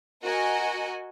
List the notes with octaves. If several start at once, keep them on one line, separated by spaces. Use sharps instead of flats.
F#4 A#4 D#5 G#5